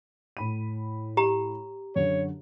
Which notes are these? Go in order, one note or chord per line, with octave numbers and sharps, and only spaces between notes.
A2 B5 D#7
G4 A#5
F#2 D3 C#5